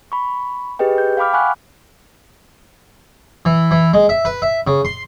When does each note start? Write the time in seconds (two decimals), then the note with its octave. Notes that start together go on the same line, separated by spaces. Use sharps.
0.12 B5 C#6
0.79 G4 G#4 B4 D#5 G5
0.98 G6
1.17 F5 G5 B5 D6 F6
1.33 F#5 G#5 B5 C#6 F#6
3.45 E3
3.71 E3
3.93 G#3
4.09 E5
4.25 B4
4.42 E5
4.67 C#3
4.85 C6